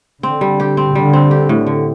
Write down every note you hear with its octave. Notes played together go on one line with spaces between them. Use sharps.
D3 C4
G3
G4
C4
D3 G3
C4
G4
A2
D3